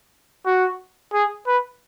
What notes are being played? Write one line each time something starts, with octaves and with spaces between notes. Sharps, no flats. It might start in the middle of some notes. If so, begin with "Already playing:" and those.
F#4
G#4
B4